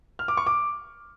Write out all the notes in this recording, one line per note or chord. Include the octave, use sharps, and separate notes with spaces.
F6
D6
C#6
D6